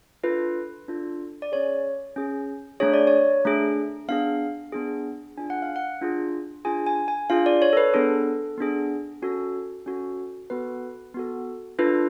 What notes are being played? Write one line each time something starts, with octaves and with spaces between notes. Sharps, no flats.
D4 F4 A4 B4
D4 F4 A4
D5
C#4 G#4 C#5
C#4 G#4
A3 D4 G#4 C#5
D5
C#5
A3 D4 G#4
B3 D4 G#4 F5
B3 D4 G#4
D4 F4 G#4 G#5
F#5
F5
F#5
D4 F4 G#4
D4 F4 G#4 G#5
G#5
G#5
D4 F4 G#4 F5
D5
C#5
A4
B4
B3 D4 G#4 A4
B3 D4 G#4
C#4 F#4 A4
C#4 F#4 A4
B3 F#4 A4 B4
B3 F#4 A4
D4 F4 A4 B4